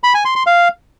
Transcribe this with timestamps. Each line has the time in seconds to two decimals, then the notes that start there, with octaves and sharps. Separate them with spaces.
0.04 B5
0.14 G#5
0.25 C6
0.36 C6
0.46 F5